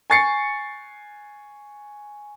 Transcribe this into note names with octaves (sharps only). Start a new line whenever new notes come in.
G#5 C#6 A6 C7 C#7